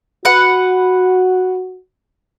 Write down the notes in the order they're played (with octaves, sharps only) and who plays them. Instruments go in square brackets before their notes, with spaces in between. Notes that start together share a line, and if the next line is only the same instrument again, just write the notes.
[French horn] F#4 [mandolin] B4 F#5